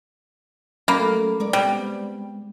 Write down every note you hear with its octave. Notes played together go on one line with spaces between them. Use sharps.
F#3 A3 A#3 C#4 B5
D#2 G#3 A#4 D5
G3 B3 C4